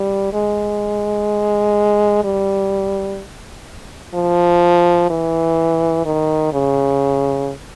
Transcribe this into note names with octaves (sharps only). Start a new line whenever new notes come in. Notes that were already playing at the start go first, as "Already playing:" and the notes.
Already playing: G3
G#3
G3
F3
E3
D#3
C#3